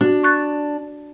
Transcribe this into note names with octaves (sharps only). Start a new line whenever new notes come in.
D4 F#4
C#6 F#6 A6